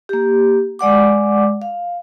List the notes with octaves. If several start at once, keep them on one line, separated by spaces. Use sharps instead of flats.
A#3 G4
G#3 D5 F#5 D6
F5